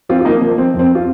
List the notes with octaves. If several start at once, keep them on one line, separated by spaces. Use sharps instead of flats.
F3 C4 F4
F4
F3 A#3 D#4
F3 A#3
F3 C4
F2
C4
F4